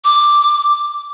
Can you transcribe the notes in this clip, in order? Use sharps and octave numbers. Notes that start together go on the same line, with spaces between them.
D6